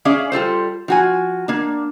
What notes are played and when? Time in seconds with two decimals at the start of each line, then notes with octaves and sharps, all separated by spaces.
0.05 C#4 G#4 D5 E5 F5
0.32 G3 F4 A4 C5
0.88 F3 F#4 G#5
1.48 A#3 D4